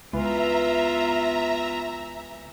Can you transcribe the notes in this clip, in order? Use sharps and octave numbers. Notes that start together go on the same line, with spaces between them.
C#2 E3 B3 F4 E5 A#5